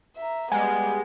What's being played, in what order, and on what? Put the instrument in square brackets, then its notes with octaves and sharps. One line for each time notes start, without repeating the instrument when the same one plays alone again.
[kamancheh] E5 A#5
[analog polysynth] G3 G#3 [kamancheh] B3 [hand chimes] G#5